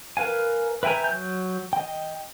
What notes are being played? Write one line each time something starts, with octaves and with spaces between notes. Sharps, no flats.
A#4 B4 F5 G#5
B4 E5 G5 G#5 A#5
F#3 G6
D#5 G5